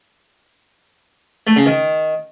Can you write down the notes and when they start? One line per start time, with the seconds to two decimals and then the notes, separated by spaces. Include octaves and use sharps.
1.47 A3
1.56 C#3
1.66 D#3